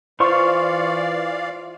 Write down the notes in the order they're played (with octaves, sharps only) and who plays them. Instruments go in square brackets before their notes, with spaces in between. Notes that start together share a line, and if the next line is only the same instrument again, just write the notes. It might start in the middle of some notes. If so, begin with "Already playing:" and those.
[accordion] E3 D5 F5 [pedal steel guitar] F4 C5 C#6